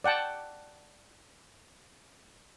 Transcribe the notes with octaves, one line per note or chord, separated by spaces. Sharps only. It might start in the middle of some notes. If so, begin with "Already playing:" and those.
D5 F#5 G5 A5